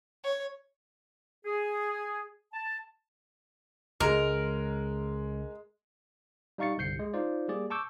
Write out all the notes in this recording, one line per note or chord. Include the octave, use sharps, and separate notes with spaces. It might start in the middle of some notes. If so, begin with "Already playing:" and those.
C#5
G#4
A5
C#2 G#3 A#4
G3 D#4 F5 C#6 A6 C#7
G1 C2 G6 C7 C#7
G#3
D#4 F4 C5 D5
G3 A#3 G#4 D5
A5 C#6 D6 E6 G6